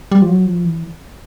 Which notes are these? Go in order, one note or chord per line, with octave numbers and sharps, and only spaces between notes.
G3
F3
F#3
F3
E3